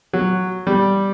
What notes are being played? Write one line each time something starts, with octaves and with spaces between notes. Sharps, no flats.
F#3
G3